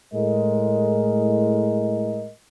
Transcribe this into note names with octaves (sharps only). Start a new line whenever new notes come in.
A2 G#3 A#4 D#5